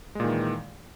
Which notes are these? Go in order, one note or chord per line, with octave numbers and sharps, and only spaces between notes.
A#2 D#3 E3 G#3